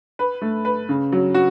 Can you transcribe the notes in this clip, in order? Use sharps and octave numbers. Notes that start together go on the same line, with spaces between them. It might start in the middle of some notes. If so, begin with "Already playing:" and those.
B4
A3
B4
C#3
F#3
F#4